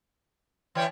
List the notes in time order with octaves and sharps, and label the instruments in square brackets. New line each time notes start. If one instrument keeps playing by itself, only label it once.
[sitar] E3 C#5 D5 [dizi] G5